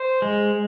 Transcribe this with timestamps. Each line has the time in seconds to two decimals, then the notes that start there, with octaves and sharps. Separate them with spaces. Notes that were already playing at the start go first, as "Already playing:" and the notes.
Already playing: C5
0.22 G#3